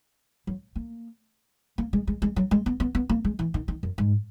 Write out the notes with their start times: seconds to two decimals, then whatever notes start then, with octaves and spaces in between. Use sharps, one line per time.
0.47 F#3
0.76 A#3
1.78 A#3
1.93 G#3
2.07 G#3
2.22 G#3
2.36 F#3
2.51 G#3
2.66 B3
2.80 B3
2.95 B3
3.09 A#3
3.25 G#3
3.39 E3
3.54 D#3
3.68 D#3
3.83 F#2
3.98 G#2